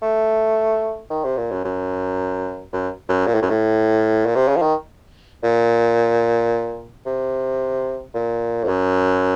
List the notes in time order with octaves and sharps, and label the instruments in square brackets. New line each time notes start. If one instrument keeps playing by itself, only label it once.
[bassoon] A3
D#3
C3
A#2
F#2
F#2
F#2
F#2
A#2
A2
F#2
A2
A#2
C3
C#3
F3
D#3
A#2
C3
A#2
F2
F#2